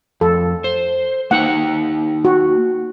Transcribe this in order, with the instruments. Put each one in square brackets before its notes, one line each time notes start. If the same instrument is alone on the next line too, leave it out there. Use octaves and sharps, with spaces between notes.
[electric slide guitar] F2 [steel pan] A4
[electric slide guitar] C5
[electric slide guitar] A#3 D#4 G5 [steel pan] F#5
[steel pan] F#4